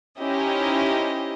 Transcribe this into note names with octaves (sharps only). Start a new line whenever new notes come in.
C#4 D#4 E4 G4 C5 D#5